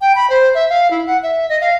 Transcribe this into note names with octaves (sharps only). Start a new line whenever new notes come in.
G5
B5
C5
E5
F5
E4
F#5
E5
D#5
F5